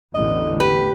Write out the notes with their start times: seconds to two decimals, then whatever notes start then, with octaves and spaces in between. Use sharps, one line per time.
0.14 A1 E2 D3 D#5
0.60 G4 B4